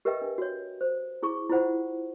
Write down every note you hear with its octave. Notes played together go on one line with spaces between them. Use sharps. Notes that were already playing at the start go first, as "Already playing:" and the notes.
G4 A#4 B4 D#5 E5 G5
D4
F#4 C#5
C5
E4 G#4 C#6
E4 F4 C5 F#5